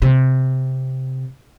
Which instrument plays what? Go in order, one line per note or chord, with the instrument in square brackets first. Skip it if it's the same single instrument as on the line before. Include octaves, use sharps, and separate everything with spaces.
[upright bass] C3